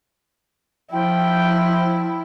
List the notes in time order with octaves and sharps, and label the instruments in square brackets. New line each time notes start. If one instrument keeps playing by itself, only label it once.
[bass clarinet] F3 [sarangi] E4 [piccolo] G5